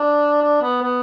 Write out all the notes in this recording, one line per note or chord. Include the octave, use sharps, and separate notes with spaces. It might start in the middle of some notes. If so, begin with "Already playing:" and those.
Already playing: D4
D4
B3
B3